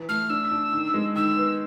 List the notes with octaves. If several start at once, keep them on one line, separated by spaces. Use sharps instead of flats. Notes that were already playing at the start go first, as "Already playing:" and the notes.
Already playing: E3
A3 F6
D4 E6
D4
D#3
G#3
D#3 E6
B3